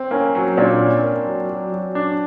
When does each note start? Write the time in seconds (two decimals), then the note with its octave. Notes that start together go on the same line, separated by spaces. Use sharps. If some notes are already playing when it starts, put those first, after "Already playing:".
Already playing: C4
0.11 A#3 C#4
0.35 F#3
0.57 A#2 D4
0.81 C#4
1.03 A#3
1.25 F#3
1.49 F#3
1.72 F#3
1.95 D4